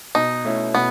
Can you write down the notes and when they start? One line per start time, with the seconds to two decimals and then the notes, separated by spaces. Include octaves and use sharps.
0.15 B2 D#4
0.45 A3 C#4 E4
0.75 B2 B3